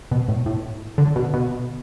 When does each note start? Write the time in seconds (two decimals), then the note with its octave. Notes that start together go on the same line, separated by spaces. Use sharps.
0.11 B2
0.28 A2
0.46 A2
0.98 D3
1.16 B2
1.34 B2